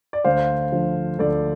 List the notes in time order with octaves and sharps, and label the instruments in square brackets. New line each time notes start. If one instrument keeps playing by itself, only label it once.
[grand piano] D5
D2 C5 F5
D3 F3
D2 A4 D5